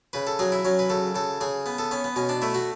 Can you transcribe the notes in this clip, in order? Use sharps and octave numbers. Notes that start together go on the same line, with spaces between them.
C#3 B4
A4
F#3 G#4
E4
F#3 C#4
B4
C#3 A4
C#3 A4
C#3 G#4
B3
A4
B3 C#4
B3
B2 C#4
D4
A3 E4
F#4